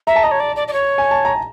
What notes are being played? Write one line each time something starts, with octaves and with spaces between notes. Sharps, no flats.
E5 A#5
A5
D#5 A#5
C#5
D5
D5
D5
C#5
G#5
A5
A#5